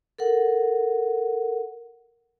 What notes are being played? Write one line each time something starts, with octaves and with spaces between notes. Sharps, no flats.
A4 A#4 F#5